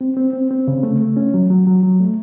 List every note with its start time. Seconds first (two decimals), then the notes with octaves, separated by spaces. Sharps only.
0.01 C4
0.17 C4
0.33 C4
0.51 C4
0.68 C#3
0.83 A3
1.00 A3
1.17 C#4
1.34 F#3
1.50 F#3
1.67 F#3
1.83 F#3
2.00 A3